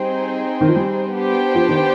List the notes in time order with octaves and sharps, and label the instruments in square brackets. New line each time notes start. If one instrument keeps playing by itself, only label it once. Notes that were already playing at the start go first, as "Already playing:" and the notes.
Already playing: [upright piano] G3 [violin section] C4 D#4 G#4 C5 G5
[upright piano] D#3
F3
G3
[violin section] B3 D4 G4 C5 G5
[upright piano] F3
D#3